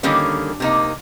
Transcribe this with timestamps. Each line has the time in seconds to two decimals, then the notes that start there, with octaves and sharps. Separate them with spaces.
0.03 D3 D#3 G3 A#3 C#4
0.60 C3 A#3 D#4